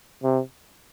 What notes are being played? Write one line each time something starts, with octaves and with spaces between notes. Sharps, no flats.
C3